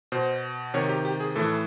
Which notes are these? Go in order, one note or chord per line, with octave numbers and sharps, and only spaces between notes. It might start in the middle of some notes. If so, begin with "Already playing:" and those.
B2 C5
C3 D#3 C#5
G4
G4
G#4
A2 E3 A4